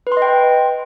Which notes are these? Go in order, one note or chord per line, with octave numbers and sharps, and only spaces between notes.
B4
C6
D#5
G5